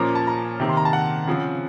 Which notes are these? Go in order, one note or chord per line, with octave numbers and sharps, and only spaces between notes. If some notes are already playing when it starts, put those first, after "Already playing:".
Already playing: A#2 F3 A#3 C#4 A#5
A5
A#5
C3 D#3 A#3
C6
A#5
A5
F#5
C#3 F3 C4